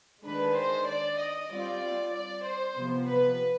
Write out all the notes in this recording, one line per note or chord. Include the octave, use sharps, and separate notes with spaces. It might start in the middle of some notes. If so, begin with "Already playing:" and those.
D#3 G#3 D4 B4
C5
D5
D#5
G3 C4 F4 D5
D5
C5
C3 F3 B3
B4